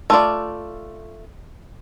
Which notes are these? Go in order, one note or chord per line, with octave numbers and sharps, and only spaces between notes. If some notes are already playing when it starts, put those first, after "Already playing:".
A3 F4 D5